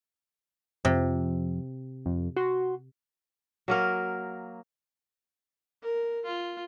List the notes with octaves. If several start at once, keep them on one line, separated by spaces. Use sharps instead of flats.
F2 C3 F3
F2
F#4 C6
F#3 A#3 A#4
A#4
F4